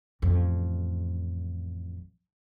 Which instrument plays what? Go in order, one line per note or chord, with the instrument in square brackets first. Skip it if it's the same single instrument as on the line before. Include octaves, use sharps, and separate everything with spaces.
[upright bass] A1 F2